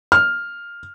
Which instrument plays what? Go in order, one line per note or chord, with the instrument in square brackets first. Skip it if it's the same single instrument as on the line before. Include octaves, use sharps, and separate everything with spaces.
[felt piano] F6